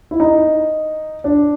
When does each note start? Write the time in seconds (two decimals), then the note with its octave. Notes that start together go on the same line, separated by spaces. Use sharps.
0.11 E4
0.20 D#4
1.24 D4